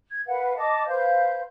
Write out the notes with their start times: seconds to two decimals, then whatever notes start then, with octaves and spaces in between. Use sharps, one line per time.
0.11 G#6
0.27 A#4 B4 F5 F#5
0.57 D#5 A5 D6
0.88 B4 C5 F5 G6